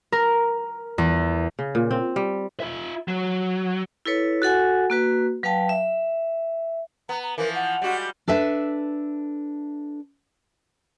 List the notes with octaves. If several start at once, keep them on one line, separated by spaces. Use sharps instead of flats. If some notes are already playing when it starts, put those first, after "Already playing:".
A#4
E2
C#3
A#2
C4
G3
F4 E5
F#3
E4 A4 B4 C#5
F#4 A4 F#5 G#5
A#3 F#4 B4
F#3 B4 F5 G5 A5
E5
B3 A#5
A#5
E3 F3 A#4
F#5
G3 G#3 F#4
D4 A4 B4 E5